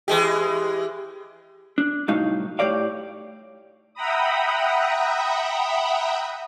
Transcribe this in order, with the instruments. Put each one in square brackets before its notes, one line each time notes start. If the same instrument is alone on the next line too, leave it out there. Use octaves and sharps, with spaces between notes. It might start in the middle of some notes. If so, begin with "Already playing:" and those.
[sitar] E3 G#3 G4
[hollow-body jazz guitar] D4
C2 A2 F#3 D#4 F5
A2 G4 C#5 D5 F5
[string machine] E5 F#5 G5 A#5 B5 D#6